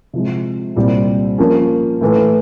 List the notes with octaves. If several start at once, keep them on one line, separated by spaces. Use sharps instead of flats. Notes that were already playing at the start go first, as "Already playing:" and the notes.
C3 F3 G#3
C2 A#2 G3 C4
F3 A#3 C#4
A2 E3 A3